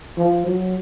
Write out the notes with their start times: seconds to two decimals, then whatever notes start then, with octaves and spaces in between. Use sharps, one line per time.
0.18 F3
0.47 F#3